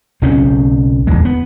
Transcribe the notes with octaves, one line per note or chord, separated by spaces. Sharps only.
B1 C#3 C4 C#4
D1 E2 G#3
B3